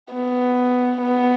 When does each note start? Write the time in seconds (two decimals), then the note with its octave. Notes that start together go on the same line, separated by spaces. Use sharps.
0.13 B3
1.01 B3